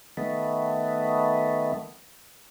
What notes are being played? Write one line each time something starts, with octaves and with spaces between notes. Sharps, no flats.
D#3 A3 B3